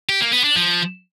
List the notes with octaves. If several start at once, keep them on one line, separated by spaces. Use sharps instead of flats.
G4
A#3
B3
D4
F3